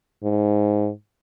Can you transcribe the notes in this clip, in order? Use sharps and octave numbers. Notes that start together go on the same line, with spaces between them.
G#2